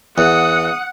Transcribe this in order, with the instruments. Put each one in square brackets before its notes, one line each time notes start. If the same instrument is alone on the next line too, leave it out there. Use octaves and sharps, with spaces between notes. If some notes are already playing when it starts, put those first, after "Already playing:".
[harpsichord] E2 [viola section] F#5 [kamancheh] D#6